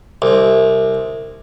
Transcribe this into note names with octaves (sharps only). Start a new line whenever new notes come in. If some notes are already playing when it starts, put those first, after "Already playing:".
C2